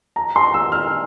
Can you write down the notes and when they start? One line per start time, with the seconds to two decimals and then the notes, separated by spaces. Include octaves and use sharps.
0.16 A#5
0.36 C6
0.54 E6
0.72 F6